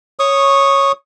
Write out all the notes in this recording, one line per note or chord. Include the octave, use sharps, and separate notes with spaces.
C#5 C#6 D#6